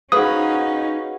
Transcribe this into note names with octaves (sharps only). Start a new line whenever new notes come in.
C#4 D#4 F#4 G#4 B4 F5 D#6